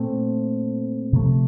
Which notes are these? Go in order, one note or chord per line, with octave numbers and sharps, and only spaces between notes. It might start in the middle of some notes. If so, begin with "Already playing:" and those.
Already playing: A#2 A3 C4
C3 F3 A3